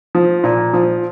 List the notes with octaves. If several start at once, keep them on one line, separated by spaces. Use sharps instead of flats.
F3
A#2
F3